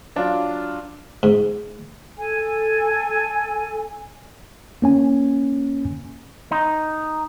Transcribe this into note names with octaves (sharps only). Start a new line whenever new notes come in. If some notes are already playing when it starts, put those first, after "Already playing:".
F#3 D4 F4
G#2
A4 G#5
A#3 C#4 G#5
D#4